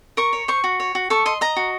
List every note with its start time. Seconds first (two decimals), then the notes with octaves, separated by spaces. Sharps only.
0.17 A#4 C#6
0.33 C#5
0.48 C5 C#6
0.64 F#4
0.80 C#5
0.95 F#4
1.10 A4 C#6
1.26 D#5 C6
1.41 D#5 A#5
1.56 F#4